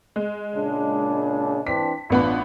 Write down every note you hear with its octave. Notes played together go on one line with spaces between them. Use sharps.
G#3
A#2 C#3 D4
E3 C4 D4 B6
A1 B3 D4 F4 B5